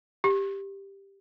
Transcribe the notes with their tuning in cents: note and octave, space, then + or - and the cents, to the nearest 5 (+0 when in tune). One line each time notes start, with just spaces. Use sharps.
G4 +5